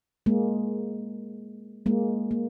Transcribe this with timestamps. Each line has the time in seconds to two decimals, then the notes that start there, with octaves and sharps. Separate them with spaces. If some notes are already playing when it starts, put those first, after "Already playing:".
0.26 G#3 A#3
1.86 G#3 A#3
2.31 A#3